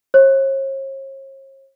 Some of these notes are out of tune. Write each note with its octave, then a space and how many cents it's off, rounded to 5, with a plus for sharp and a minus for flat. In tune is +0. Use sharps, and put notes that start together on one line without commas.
C#5 -45